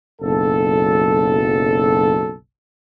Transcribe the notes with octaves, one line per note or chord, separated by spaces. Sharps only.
F#1 B1 A4